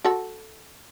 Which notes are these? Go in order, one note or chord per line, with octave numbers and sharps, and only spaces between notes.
F#4 A4